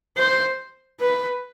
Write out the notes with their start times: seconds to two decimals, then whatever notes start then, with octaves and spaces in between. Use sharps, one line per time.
0.17 C5
1.00 B4